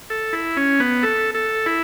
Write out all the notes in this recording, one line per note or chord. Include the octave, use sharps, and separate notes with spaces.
A4
E4
C#4
B3
A4
A4
E4